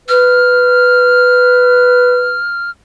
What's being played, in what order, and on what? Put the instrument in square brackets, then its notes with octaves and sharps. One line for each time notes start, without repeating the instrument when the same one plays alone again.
[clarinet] B4 [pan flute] F6